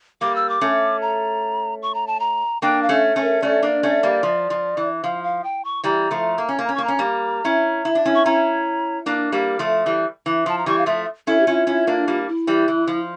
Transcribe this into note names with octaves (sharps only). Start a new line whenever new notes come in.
G3 A#3 D6
E6
D6
A3 C#4
A#5
C#6
A#5
A5
A#5
A#3 D4 G5
F5
A3 C#4
A3 C#4
A#4
A3 C#4 D5
A#3 D4
A3 C#4
G3 A#3
F3
F3
E3
F3 F5
F5
G5
C#6
E3 G3 A#5
F3 A3
A#3
C#4
A#3
C#4 A#5
A#3 C#6
C#4 A#5
G3 A#3
C#4 E4
E4
D4
C#4 E4
C#6
C#4 E4 A#5
A#3 D4
G3 A#3
F3 A3
E3 G3
E3
F3 A5
A#5
E3 G3 C#6
F5
F3 A3 E5
C#4 E4 A4
G4
C#4 E4 F4
C#4 E4
A#3 D4
G3 A#3
E4
E3 G3
E3
F3